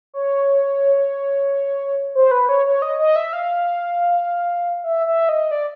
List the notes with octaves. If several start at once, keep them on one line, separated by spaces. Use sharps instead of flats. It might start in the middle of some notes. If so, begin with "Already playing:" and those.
C#5
C5
B4
C#5
C#5
D#5
D#5
E5
F5
E5
E5
D#5
D5